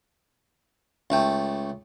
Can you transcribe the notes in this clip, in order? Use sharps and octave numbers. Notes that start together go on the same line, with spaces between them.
C#2 A3 G5